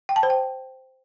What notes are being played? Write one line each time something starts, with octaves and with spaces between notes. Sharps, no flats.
G5
A5
C5
G5